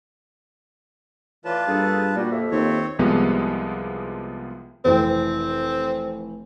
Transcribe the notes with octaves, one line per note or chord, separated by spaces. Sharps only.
A2 E3 F4 B4 D5 A5
G2 A#3 G#4 A4
A#2 G3 F#4
F2 A#3 E5
D#2 C4 C#5
C2 C3 F3 G#3 B3
F1 E3 C4 G5